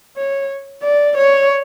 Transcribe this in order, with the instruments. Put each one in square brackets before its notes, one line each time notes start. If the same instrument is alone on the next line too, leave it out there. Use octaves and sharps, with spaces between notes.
[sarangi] C#5
D5
C#5